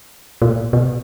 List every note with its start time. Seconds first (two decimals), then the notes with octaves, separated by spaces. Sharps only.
0.42 A#2
0.73 B2